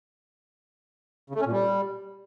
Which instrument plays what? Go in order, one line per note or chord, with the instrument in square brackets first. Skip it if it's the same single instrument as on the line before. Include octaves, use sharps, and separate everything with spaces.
[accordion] C#3
A3
C#4
A#2
G3